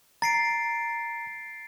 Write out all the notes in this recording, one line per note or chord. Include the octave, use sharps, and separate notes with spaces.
A#5 A6 C7 D7